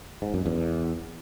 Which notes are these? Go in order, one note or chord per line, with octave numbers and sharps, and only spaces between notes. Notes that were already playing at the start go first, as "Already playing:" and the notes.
G#2
F#2
E2